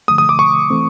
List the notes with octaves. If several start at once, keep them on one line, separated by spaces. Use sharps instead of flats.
D3 F3 A3 D#6
D#6
D6
C#6
E3 A3 C4